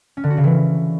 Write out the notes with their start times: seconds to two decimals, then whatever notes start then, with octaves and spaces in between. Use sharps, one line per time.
0.17 C#4
0.24 D3
0.30 F#4
0.37 C#3
0.44 E3